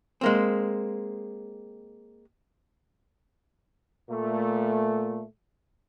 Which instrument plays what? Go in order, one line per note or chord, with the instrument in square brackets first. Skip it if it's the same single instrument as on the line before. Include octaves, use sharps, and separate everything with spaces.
[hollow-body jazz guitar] G#3 A#3 C4
[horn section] A#2 A3